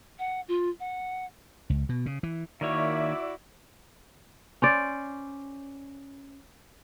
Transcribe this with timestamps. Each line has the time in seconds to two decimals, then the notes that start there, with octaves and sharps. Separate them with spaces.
0.19 F#5
0.48 F4
0.80 F#5
1.70 C#2
1.89 B2
2.06 C#3
2.23 E3
2.61 D#3 A#3 E4 F#4 C#5 D5 E5
4.62 C#4 C5 D5